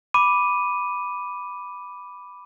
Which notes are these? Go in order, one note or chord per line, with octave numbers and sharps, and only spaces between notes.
B5 D6 D#7